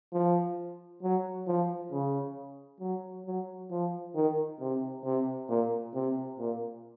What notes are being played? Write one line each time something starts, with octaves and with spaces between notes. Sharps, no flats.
F3
F#3
F3
C#3
F#3
F#3
F3
D#3
C3
C3
A#2
C3
A#2